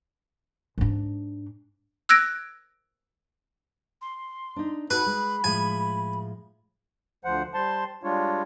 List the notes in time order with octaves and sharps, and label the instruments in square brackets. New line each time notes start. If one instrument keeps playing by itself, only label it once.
[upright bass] G#2 D4
[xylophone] E6 F#6 G#6 A#6 D7
[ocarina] C6
[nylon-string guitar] D4 D#4
[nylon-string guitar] D#4 F#4 A4 [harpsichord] B4 [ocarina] B5
[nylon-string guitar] G#3
[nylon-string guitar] A2 F3 G#3 [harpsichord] G#5
[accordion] D2 F3 C5 F#5
G3 C5 A5 C6
G3 G#3 D4 F4 C#5